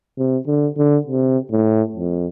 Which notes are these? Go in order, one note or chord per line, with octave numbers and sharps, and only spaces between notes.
C3
D3
D3
C3
A2
F2